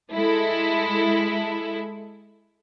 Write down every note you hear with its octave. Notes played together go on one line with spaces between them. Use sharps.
G#3 E4 A4